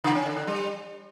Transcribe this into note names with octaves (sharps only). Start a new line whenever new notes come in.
C#3
C#4
D3
D3
G3